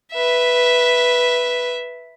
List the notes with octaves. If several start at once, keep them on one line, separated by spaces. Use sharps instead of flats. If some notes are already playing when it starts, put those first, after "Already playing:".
B4 E5